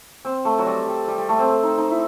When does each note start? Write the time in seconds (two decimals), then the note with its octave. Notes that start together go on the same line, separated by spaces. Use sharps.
0.25 C4
0.45 A3
0.59 F#3
0.66 G3
0.87 G3
1.08 G3
1.18 G3
1.29 A3
1.39 C4
1.49 C4
1.63 D#4
1.78 D#4
1.91 E4